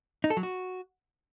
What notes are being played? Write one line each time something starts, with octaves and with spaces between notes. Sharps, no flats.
D#4
A4
F#3
F#4